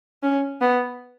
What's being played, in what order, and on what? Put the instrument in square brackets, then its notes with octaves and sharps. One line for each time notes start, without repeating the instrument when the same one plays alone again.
[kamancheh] C#4
B3